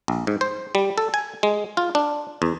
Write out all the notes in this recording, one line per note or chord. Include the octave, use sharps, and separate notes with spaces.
A#1
G#2
C5
G3
A4
G#5
G#3
F4
D4
E2